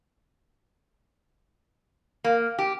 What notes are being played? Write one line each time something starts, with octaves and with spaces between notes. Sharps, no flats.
A#3
G4